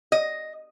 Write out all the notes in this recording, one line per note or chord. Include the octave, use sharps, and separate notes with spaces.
D#5